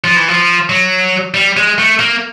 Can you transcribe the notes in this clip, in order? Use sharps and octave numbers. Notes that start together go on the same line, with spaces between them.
F3
E3
F3
F#3
G3
G#3
A3
A#3